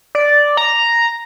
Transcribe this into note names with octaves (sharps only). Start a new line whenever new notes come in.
D5
A#5